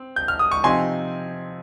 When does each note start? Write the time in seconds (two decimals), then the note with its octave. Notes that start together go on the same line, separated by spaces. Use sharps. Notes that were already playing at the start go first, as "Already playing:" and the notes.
Already playing: C4
0.16 G6
0.28 F6
0.39 D#6
0.52 C#6
0.63 C3 F3 C4 D#4 G#5 C6